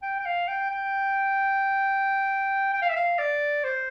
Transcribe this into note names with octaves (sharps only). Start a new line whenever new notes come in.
G5
G5
F5
G5
G5
G5
F5
E5
F5
D5
C5